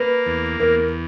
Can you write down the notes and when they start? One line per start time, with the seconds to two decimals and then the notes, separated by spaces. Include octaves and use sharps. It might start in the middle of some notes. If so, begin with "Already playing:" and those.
Already playing: A#3 B4
0.26 E2
0.60 E2 A#4